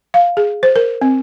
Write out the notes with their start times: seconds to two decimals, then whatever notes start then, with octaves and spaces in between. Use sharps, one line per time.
0.14 F5
0.37 G#4
0.63 C5
0.76 A#4
1.01 C4